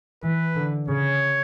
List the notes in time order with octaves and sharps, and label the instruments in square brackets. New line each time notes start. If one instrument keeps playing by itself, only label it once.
[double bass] E3 [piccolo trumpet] B4
[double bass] D3
[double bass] C#3 [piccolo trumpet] C#5